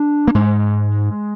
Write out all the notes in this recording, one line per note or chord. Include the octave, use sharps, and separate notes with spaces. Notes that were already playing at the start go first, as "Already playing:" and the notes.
Already playing: D4
A#3
G#2 G#3